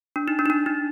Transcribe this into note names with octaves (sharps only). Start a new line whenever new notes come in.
D4
D#4
D4
D#4
D4
D#4